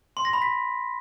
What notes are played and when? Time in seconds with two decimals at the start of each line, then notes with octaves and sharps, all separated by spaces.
0.17 C6
0.25 A#6
0.33 B5
0.42 B6